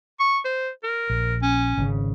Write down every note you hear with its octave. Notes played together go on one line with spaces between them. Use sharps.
C#6
C5
A#4
A#1
C#4
G#1 C#3